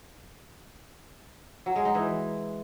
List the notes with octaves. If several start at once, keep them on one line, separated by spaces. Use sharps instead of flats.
F#3
G#3
D#4
E3